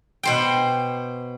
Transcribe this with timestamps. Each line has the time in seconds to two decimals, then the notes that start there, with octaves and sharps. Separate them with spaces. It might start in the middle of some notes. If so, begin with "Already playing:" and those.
0.23 B2 C5 G5